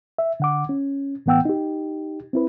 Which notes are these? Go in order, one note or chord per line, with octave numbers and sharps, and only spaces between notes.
E5
D3 F#5 D6
C#4
A2 E3 B3 F#5 G5 E6
D#4 G4
C4 E4 B4